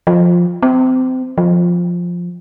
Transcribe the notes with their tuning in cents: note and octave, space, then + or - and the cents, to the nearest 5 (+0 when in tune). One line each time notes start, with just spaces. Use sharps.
F3 +5
C4 -25
F3 +5